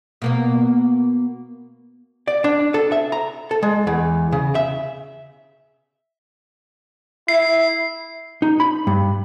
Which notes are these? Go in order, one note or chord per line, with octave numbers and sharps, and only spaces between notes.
B2 A#3 B3
D5
D4
A4
E5
A#5
A4
G#3
E2
C#3
E5
E4 C7
D#4
B5
G2